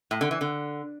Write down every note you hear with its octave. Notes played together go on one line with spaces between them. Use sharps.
A2
D3
E3
D3